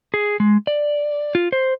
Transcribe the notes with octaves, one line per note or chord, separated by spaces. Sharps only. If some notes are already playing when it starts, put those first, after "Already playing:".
G#4
G#3
D5
F4
C5